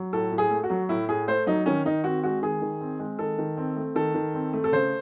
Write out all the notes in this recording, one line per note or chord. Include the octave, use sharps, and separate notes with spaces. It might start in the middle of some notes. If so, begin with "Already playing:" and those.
Already playing: F#3
A2 A4
A2
G#4
A3
F#4
F#3
A2 E4
A2 G#4
A3 C5
F#3 D#4
D#3 C#4
D#3 D#4
C4 F#4
G#3 F#4
D#3 G#4
D#3
C4
G#3
D#3 A4
D#3
C4
A3
D#3 A4
D#3
C4
A3
A4
C#3 C5